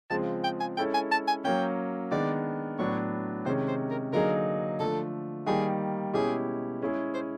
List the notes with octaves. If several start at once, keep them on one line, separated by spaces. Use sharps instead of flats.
C#3 F3 G#3 C4 A5
G5
G#5
G#3 C#4 E4 A4 G5
G#5
A5
G#5
F#3 A#3 C#4 G5
D#3 G#3 B3 D4 D5
A2 F#3 B3 D4 C#5
C3 D#3 G#3 C#4 C5
C5
A#4
D3 F#3 A#3 D#4 G#4 A#4
D3 F3 A3 A4
D#3 G3 A#3 G#4
B2 G#3 C#4 E4 G4 G#4
G#3 C#4 E4 G#4
C5